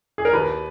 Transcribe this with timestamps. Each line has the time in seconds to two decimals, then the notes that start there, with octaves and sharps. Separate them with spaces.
0.18 G#4
0.25 A#4
0.33 D#2 B4